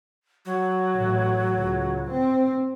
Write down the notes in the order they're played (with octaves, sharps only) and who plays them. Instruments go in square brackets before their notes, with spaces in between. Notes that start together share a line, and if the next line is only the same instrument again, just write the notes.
[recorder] F#3
[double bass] A1
C#2
C4